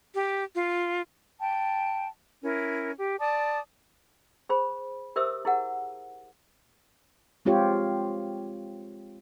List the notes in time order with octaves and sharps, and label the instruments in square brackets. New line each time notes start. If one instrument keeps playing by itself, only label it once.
[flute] G4
F4
[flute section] G5 A5
C#4 E4 A#4
G4
D5 A5 D6 D#6
[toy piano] G#4 C5 B5
G4 A#4 C5 E5 D#6 E6
E4 G#4 A#4 F#5
[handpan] G#3 C4 F4 G4 C#5